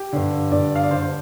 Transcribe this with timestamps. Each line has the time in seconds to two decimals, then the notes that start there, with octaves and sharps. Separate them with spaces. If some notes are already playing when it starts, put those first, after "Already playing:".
Already playing: G4
0.13 G2 D3
0.51 G2 D3 D5
0.76 F5
0.83 D5
0.91 G2 D3 C5
1.02 C5